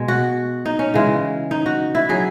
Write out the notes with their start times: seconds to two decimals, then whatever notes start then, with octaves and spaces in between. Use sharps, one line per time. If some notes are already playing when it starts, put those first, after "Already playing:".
Already playing: B2 G#3 G#4
0.08 F#4
0.66 D#4
0.79 C#4
0.94 C#3 E3 G#3
1.51 D#4
1.66 F#4
1.95 E4
2.09 F#3 G#4